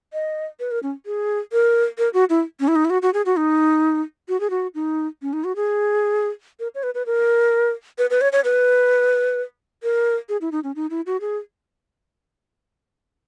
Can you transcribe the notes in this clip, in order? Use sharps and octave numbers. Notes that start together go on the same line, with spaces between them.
D#5
B4
A#4
C#4
G#4
A#4
A#4
F#4
E4
C#4
E4
D#4
E4
F#4
F#4
G#4
F#4
D#4
F#4
G#4
F#4
D#4
C#4
D#4
F#4
G#4
A#4
C#5
B4
B4
A#4
B4
B4
C#5
C#5
B4
A#4
G#4
E4
D#4
C#4
D#4
E4
F#4
G#4